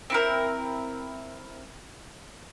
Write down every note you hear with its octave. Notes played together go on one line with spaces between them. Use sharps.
C4 E4 A#4